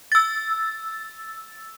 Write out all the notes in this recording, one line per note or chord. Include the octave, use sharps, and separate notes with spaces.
E6 A6